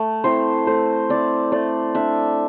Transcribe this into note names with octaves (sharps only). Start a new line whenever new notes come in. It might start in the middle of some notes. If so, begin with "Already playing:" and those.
Already playing: A3
C4 E4 C5
A3 C5
C4 E4 D5
A3 D5
D4 E5